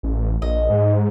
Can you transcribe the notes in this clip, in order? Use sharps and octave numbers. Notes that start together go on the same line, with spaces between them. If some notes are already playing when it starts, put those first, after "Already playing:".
A1
A#1 D#5
G#2